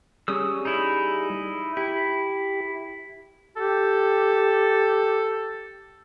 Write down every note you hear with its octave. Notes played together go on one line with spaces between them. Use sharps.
G3 C#4 G#4 D#6 E6
D#4 E4
E4 G4
G4 A4